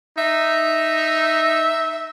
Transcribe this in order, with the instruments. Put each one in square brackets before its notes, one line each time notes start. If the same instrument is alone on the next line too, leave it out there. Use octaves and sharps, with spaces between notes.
[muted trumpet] D#4 [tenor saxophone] E5